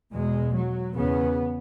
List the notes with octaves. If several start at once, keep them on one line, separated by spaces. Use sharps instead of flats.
E2 B2 G#3
F#3
E2 C#3 B3